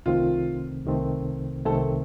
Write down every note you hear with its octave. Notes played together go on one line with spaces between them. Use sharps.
C2 C3 D#3 A3 C4 F4
C2 C3 D#3 A3 C4
C2 C3 D#3 A3 C4 A4